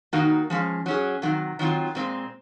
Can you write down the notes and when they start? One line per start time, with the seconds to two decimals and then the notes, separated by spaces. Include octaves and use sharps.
0.13 D#3 A#3 D#4 F#4
0.50 F3 G#3 C#4
0.86 F#3 C#4 G#4
1.22 C3 D#3 F#3
1.59 D#3 F#3 C4 F4
1.95 A#2 G#3 C4